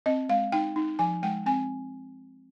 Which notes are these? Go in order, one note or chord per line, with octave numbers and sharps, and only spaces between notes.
C4 D#5
G#3 F5
D#4 G5
D#4
F3 G#5
G#3 G5
C4 G#5